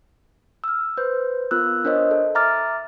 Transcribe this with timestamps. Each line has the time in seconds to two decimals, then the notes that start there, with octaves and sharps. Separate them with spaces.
0.64 E6 F6
0.97 B4 C5 G6
1.51 B3 F4 A#4 E6 F#6
1.85 D4 A#4 C5 C#5 D#5
2.11 A4
2.35 E5 A#5 D6 F6 A6